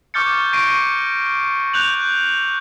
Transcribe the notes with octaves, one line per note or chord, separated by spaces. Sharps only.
C#6 D6 F6 G6 A6 C#7
C#6 A#6 C7 D7 D#7
F#6 G6 F7 F#7